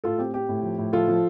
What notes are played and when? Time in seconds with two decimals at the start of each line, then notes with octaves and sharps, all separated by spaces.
0.04 A2 F4 A4
0.19 C4 G4
0.34 C4 G4
0.49 A2
0.63 F3
0.78 A2
0.93 F3 F4 A4
1.08 F3